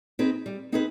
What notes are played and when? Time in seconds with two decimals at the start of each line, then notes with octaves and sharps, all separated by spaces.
0.19 C4 D#4 G#4 B4
0.46 G3
0.72 C4 D#4 G#4 B4